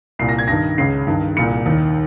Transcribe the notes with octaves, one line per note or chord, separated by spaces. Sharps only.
C2 A#2 C7
A#6
G#6
G2 D#3 A#6
C#2 C#3 C7
G2 D#3
C2 A#2 C#7
D#2 D#3